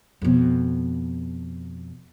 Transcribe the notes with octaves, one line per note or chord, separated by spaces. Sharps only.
F2 B2